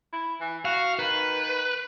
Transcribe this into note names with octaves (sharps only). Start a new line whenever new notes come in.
E4
E3
F#4 F5
D#3 B4